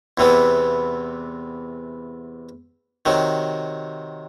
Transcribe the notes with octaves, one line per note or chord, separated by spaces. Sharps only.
E2 C3 E3 B3
C3 D#3 F#3